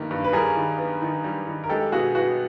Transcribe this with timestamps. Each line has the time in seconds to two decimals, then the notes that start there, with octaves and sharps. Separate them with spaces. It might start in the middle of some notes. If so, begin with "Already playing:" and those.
Already playing: G2 D#3 G3 A#3
0.11 G2
0.24 B4
0.33 G3 G#4 A#4
0.56 D#3
0.78 B3
1.02 D#3
1.24 G3
1.47 D#3
1.64 A#4
1.69 G#3 G4 A4
1.92 B2 F#4 G#4
2.15 B3 F#4